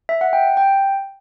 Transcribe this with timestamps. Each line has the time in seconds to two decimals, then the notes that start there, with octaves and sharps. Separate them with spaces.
0.09 E5
0.21 F#5
0.33 G5
0.57 G5